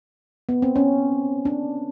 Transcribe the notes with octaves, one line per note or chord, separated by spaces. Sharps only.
B3
C4
C#4
D4